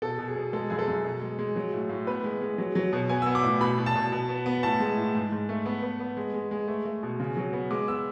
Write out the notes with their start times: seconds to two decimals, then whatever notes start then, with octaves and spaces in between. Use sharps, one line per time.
0.02 B2 A4
0.19 B2
0.28 G#4
0.36 B2
0.53 G#3 A4
0.70 F#2 G#4
0.79 A4
0.87 F#2
1.04 B2
1.21 G#3
1.39 G#3
1.56 F#3
1.73 A2
1.89 A2
2.07 B3 B4
2.24 G#3
2.41 G#3
2.58 F#3
2.75 F#3
2.93 B2
3.09 B3 G#5
3.22 E6
3.26 B3
3.35 D6
3.43 A2
3.61 B2 B5
3.78 B2
3.86 A5
3.95 B2
4.12 B2
4.29 B3
4.46 B3
4.63 A2 A5
4.80 G#3
4.97 A2
5.15 G#2
5.32 G#2
5.49 A3
5.66 B3
5.83 B3
6.00 B3
6.17 G#3
6.34 G#3
6.51 G#3
6.68 A3
6.85 A3
7.03 B2
7.20 C#3
7.37 F#3
7.53 B3
7.71 G#3 D6
7.88 B3 E6